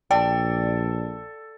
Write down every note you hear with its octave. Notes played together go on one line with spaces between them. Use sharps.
A#1 A4 D5 G5